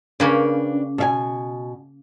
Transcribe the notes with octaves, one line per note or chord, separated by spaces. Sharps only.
C#3 A#3 C#4 D4 B4 G5
B2 E5 G#5